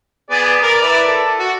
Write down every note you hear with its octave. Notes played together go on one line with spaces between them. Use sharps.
B3 G#4 D5
A#4 D5
E4 B4 D5
A4
F#4